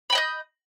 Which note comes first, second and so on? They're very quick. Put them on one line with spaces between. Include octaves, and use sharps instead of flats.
B5 G5 D#5 G6